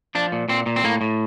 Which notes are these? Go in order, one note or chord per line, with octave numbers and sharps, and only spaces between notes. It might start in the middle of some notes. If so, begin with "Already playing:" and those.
F3 D4
A#2
A#2 C4
A#2
C4
A2 A#3
A2